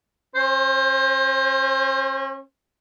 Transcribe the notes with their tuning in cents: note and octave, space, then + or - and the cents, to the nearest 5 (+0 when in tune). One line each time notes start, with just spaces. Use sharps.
C#4 -40 C5 +25